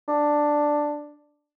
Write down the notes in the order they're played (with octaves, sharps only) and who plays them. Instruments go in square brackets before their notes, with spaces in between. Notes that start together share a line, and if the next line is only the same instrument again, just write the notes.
[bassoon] D4